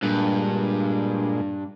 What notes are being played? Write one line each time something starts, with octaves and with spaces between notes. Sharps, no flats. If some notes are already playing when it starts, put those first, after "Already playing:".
G2 A#2 G#3